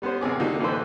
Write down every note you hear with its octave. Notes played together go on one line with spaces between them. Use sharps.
G3 B3 C#4 C5
G#1 C3 G#4 D6
D3 F3 A#3 D#4 F#4 G4
A1 E3 E4 B4 C5